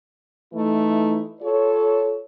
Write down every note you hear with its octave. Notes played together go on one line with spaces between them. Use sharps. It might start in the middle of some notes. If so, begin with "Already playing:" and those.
E3 A3 D#4 E4
F4 A4 C#5